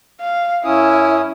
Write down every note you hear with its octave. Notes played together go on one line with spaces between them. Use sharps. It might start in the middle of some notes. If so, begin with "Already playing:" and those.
F5
F#2 C#4 E4 D#6